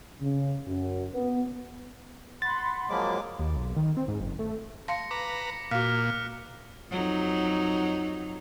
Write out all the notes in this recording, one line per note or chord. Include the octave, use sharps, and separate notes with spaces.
C#3
F#2
B3
F#5 B5 C6 A6
F3 F#3 G#3 A#3 B5 D6
D#2
B1
D#3
C4
G#2
F#1
A3
F5 A5 C6 A#6 C#7
B4 A#5 D6
A#2 F#4 F5 F6 F#6 B6
F2 F#3 D#4